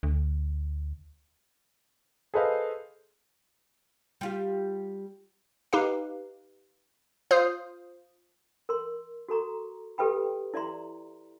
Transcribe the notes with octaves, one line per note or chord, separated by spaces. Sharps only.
D2
G#4 A4 B4 C5 D#5 F5
G3 F4 G4
D#4 G4 B4 F5
F4 C5 F5 D#6
A#4 C6
F#4 A4 A#5 C#6
G4 A4 B4 E5 G5 B5
E4 D5 E5 A#5 C6